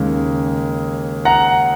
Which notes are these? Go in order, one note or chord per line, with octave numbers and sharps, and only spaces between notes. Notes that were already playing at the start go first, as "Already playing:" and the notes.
Already playing: D#2 C#3 G#3
F#5 A#5